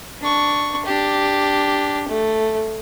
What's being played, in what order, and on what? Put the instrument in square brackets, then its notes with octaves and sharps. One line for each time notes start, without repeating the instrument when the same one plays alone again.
[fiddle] D4 C#6
D4 G4
A3